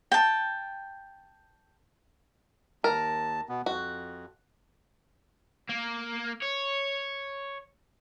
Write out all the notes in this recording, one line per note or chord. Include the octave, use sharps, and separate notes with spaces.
G5 A5
D#2 A#4 A5
B2 B3
F2 F#4
A#3
C#5